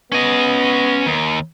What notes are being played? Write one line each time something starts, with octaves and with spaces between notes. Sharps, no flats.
B3 C#4 D#5
D#2